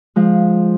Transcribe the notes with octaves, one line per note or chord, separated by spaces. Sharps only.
F3 G#3